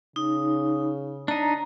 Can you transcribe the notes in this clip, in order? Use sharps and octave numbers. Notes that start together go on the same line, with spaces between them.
C#3 D#4
D4 D#4 A#5